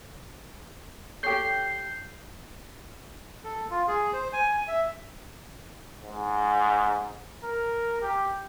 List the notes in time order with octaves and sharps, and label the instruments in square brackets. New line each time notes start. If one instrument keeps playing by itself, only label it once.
[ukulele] G4 A4 C#5 [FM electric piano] G6 C7
[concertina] A4
F4
G#4
C5
G#5
E5
[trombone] G#2
A#4
G4